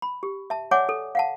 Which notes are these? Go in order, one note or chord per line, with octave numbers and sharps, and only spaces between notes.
B5
G4
E5 A5
C#5 D5 E5 F#5 G#5 D6
A4
F5 F#5 A5